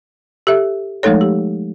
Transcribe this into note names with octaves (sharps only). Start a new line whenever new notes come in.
G4 A4 E5
F3 G#3 A3 D#4 A4 C#5
G4